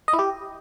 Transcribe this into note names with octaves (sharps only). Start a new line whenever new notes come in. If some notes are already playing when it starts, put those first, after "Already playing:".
D#5
E4
G4